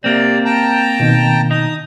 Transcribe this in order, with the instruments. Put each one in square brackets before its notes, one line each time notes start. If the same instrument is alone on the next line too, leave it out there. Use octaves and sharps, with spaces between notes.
[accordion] C3 D5 [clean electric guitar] A#3 C4
[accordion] G5 A5 A#5
[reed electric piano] B2 D#3
[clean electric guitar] D#4 [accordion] D#6